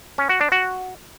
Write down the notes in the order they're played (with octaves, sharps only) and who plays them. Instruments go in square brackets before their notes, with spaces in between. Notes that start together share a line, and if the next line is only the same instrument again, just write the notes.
[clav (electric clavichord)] C#4
F#4
D4
F#4